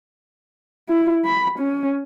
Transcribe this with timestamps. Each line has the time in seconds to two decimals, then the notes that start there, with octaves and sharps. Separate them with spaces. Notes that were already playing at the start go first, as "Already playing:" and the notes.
0.89 E4
1.25 B5
1.59 C#4